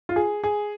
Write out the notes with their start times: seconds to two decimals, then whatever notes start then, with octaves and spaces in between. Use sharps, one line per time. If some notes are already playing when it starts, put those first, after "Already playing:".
0.09 F4
0.16 G#4
0.44 G#4